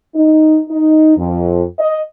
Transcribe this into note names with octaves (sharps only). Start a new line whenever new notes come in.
D#4
D#4
F2
D#5